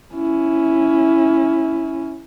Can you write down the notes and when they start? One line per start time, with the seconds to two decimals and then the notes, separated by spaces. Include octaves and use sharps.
0.14 C#4 E4